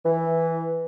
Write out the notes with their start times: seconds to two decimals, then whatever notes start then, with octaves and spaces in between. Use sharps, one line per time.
0.05 E3